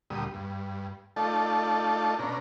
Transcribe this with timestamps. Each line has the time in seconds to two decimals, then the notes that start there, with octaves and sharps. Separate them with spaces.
0.10 D2 A#2 G3 D#6
0.34 G2
1.16 A3 D#4 F4 A4 D5 A5
2.19 B2 C#4 D4 A#5